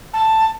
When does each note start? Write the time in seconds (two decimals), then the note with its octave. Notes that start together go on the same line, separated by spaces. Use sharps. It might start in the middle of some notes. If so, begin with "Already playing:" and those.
0.13 A5